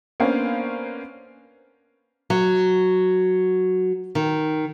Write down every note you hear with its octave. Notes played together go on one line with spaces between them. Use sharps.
A#3 B3 C#4 D4 C5 F5
F#3
D#3